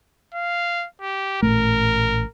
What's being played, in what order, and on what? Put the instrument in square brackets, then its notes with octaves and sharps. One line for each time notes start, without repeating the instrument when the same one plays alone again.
[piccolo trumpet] F5
G4
[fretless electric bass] A1 A#2 A3 [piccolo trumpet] A#4